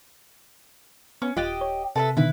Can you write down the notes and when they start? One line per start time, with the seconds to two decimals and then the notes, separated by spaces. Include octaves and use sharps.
1.22 B3 C#4
1.37 D#1 F4 G4 D#5 F#6 A6
1.61 C#5
1.96 C3 A4 B4 E5
2.17 B2 D3 D#3 E4 B4